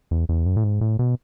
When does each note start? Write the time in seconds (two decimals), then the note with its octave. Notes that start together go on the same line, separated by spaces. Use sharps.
0.11 E2
0.29 E2
0.46 F#2
0.57 A2
0.64 G#2
0.81 A2
0.99 B2